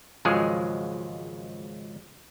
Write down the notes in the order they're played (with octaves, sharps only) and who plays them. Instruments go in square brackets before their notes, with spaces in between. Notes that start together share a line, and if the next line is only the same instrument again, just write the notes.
[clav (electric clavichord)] G#1 C#2 F3 F#3 G#3 G#4